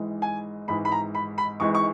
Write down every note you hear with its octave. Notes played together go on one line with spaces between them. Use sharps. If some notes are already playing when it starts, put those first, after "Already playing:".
Already playing: G#1 G#2 E3 G#3
G#5
G#1 G#2 E3 G#3 B5
B5
A#5
B5
B5
G#1 G#2 E3 G#3 C#6
C#6